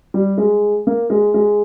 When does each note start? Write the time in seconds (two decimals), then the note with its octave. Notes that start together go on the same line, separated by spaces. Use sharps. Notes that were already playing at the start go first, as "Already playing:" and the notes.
0.14 G3
0.38 G#3
0.87 A#3
1.10 G#3
1.34 G#3